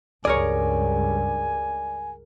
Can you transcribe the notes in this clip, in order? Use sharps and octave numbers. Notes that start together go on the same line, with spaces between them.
C#2 G2 G#4 A#4 C#5 D5 G#5